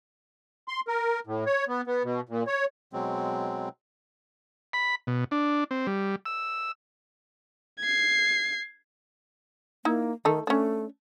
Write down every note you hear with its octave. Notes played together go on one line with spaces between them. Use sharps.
C6
A#4
A2
C#5
B3
B3
B2
A#2
C#5
B2 F#3 G#3 C4
B5
B2
D4
C4
G3
E6
G#6 C7
A#3 D#4 E4
D#3 A3 D#4 A4
A3 C#4 D4